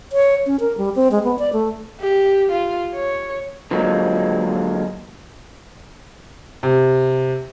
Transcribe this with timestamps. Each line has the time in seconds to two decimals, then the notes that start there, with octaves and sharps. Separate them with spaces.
0.12 C#5
0.46 C#4
0.60 A#4
0.78 G3
0.95 C4
1.11 G#3
1.24 B3
1.39 D5
1.53 A3
2.00 G4
2.52 F4
2.95 C#5
3.71 D3 F3 F#3 G#3 A#3
6.63 C3